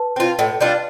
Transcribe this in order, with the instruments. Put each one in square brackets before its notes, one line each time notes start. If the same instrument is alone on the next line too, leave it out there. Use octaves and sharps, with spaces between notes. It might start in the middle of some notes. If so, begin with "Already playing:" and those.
Already playing: [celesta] B4 A5
[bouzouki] C4 F4
A2
G3 D4 F4